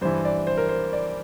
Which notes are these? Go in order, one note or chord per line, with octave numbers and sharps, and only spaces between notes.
G2 E3 C5
D5
C5
A#4
C5
D5